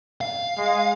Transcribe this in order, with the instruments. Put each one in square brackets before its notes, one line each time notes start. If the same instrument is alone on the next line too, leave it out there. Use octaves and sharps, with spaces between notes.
[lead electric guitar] F5
[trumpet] G#3